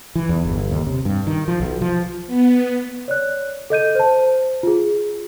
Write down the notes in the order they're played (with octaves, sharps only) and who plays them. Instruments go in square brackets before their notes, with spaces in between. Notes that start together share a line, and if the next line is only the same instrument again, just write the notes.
[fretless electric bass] E3
E2
G1
D#2
C3
G2
D#3
F3
B1
F3
[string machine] B3
[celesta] C#5 D5 F#6
A4 D#5 G6 D#7
C5 A5
F4 G#4